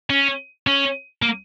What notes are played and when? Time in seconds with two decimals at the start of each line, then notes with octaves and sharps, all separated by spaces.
0.10 C#4
0.67 C#4
1.22 A#3